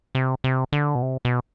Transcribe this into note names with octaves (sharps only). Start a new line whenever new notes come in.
C3
C3
D3
B2
C3
B2